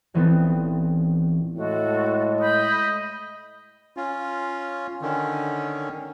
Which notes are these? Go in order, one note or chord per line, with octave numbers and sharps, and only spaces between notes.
D#1 E3 B3 C4 A4
A2 G#3 F#4 A4
D#5 B5 G6
C#4 F4
D3 D#3 C#4